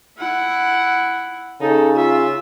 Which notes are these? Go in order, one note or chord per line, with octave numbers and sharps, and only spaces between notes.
E4 F#5
C#3 D#4 A4
F4 E5